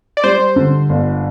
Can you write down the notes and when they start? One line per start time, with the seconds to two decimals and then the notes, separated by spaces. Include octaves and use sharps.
0.17 D5
0.24 G3 C5
0.56 D3
0.89 G1